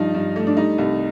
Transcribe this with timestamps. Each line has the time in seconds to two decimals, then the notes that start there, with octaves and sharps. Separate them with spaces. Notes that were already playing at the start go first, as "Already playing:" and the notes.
Already playing: G2 F3 D#4
0.15 G2
0.36 A3
0.47 D4
0.57 G3 D#4
0.78 C2